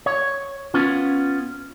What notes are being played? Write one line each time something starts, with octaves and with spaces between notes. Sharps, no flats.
C#5
B3 C#4 F4